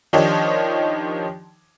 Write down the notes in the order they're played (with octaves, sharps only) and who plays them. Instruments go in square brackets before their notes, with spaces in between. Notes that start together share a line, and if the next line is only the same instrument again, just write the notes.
[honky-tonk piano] D#3 F3 D4 D#4 G4 C#5